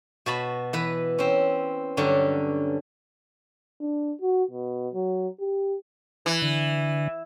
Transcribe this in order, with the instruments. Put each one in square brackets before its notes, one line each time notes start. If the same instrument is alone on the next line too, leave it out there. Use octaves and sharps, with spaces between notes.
[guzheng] B2 F#4 A5 B5
E3 B4
C4 C#4
G2 D3 F#3 C#4
[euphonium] D4
F#4
B2
F#3
G4
[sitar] E3
[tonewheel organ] D3